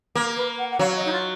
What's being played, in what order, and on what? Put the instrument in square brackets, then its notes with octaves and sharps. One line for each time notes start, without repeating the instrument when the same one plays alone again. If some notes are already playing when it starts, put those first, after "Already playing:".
[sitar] A#3 [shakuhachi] A#4
[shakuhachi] B4
F#5
F#5
[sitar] F#3 [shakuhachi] F5
[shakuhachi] D#5
D#4
F4